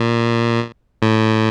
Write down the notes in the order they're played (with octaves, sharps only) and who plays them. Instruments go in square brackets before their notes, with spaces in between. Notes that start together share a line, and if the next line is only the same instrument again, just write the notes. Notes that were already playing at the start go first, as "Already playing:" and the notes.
Already playing: [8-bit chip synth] A#2
A2